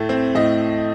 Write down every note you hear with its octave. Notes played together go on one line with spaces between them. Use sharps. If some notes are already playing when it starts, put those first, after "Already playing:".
Already playing: A2 A3
C4
A2 D#5